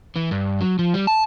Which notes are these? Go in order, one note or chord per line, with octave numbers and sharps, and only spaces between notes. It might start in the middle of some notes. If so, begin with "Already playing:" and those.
E3
G2
F#3
F3
G3
A5